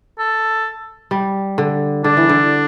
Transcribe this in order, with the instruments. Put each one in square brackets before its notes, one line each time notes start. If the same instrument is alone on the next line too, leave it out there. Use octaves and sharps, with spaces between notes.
[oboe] A4
[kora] G3
D3
[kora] D3 [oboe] D4
[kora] E3
D3